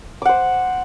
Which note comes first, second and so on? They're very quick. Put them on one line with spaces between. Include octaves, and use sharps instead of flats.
D6 F#5 C5